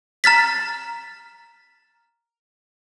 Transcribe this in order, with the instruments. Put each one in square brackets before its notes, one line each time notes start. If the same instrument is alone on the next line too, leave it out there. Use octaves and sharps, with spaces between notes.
[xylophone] A#5 F6 A6 B6